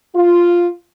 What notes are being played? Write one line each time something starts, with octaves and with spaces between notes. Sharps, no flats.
F4